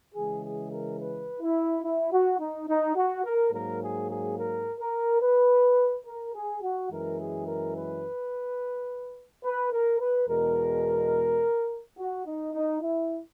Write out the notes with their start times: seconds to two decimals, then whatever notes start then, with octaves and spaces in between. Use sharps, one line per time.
0.14 C#3 E3 G#3 G#4
0.43 G#4
0.71 A#4
0.99 B4
1.41 E4
1.84 E4
2.12 F#4
2.39 D#4
2.69 D#4
2.96 F#4
3.25 A#4
3.52 G#2 F#3 A#3 A#4
3.80 G#4
4.09 G#4
4.37 A#4
4.79 A#4
5.21 B4
6.06 A#4
6.34 G#4
6.62 F#4
6.90 F#2 E3 G#3 A#4
7.19 G#4
7.46 A#4
7.75 B4
9.44 B4
9.72 A#4
10.00 B4
10.28 E2 B2 G#3 A#4
11.98 F#4
12.26 D#4
12.54 D#4
12.81 E4